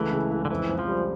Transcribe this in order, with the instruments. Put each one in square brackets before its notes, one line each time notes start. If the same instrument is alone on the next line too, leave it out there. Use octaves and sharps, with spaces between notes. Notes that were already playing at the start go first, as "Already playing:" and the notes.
Already playing: [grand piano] C#2 A3 [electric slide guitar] E3
[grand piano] C#3
C#2
[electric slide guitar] D3
[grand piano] F2 [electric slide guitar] E3
[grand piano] F2
[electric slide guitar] F3
[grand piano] G3